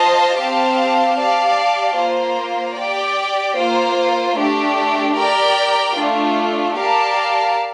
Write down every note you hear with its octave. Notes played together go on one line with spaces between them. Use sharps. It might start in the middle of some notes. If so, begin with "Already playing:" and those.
Already playing: F4 C5 D#5 A5
C4 G4 C5 F5 A5
G4 D5 F5 A5
A#3 F4 C5
G4 D5 G5
A#3 F4 C5
A3 D4 G4
G4 A#4 D5 G5
A3 D4 F4
G4 A#4 D5 F5 A5